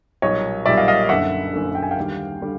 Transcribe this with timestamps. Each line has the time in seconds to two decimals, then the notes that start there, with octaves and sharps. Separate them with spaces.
0.22 B1 A#2 G3 C#5 D#5
0.66 B1 A#2 G3 D5 E5
0.77 D#5 F5
0.88 D#5 F5
1.09 F#1 F#2 D3 E5 F#5
1.53 F#1 F#2 D3
1.75 G5
1.82 G#5
1.91 F5 G5
1.97 D#2 D3 G3
2.42 D3 G3